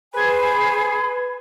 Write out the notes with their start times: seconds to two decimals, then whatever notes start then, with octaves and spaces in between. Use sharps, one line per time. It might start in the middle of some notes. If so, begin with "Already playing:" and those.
0.14 G#4 B4 C5 G#5 B5 G#6